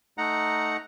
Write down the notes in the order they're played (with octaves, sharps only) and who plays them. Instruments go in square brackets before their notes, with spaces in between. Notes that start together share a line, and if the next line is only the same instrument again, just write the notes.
[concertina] A3 D#4 F#5 A#5